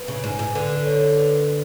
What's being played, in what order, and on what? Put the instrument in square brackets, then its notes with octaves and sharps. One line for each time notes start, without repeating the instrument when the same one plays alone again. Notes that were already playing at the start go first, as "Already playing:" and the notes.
Already playing: [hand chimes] B4
[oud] C#3
G#2
G#2
[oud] D3 [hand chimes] B4
[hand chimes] C#5
B4